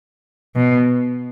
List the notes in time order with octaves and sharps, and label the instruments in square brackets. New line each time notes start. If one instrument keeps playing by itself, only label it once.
[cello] B2